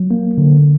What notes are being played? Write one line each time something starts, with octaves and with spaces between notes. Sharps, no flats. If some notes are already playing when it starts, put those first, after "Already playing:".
Already playing: F#3
A#3
D3